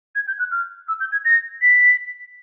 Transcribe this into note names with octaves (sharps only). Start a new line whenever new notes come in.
G#6
G6
F#6
F6
E6
G6
G#6
A#6
B6